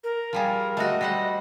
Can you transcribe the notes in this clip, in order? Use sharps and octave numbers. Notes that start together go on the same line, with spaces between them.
A#4
F3 G3 G#4
A3 F#4 D#5
G3 C5 F#5